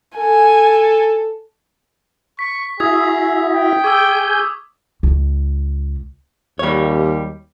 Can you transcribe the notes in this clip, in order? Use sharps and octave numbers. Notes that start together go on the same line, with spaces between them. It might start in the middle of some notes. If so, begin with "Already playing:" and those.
A4 G#5
C#6 B6
E4 F#4 G#4 E5 D#6 G#6
G5
G#4 G#5 C#6 D6 E6 G6
C#2
D#2 G3 C#5